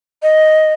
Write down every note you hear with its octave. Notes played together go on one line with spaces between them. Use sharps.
D#5